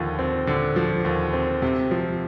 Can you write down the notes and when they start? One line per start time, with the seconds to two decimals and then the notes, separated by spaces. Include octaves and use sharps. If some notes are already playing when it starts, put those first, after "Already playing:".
Already playing: D#2 D3 F3
0.19 C4
0.47 D3
0.76 F3
1.05 D#2
1.33 C4
1.62 C3
1.91 F3